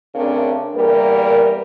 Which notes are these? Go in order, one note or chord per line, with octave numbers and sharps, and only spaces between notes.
C#3 A3 C4 D4 A#4
E2 G3 A#3 A#4